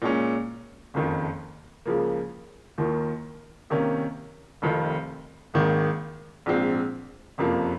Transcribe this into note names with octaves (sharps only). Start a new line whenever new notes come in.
A#2 G#3 C#4
F#1 F2 D#3
C#2 C#3 F3 A#3
D#2 D#3 A#3 F4
C3 D#3 A#3 C#4
F1 F2 D#3
G#1 G#2 D#3 A#3
A#1 G#2 F3 C4
F#1 F2 C3 F3 A#3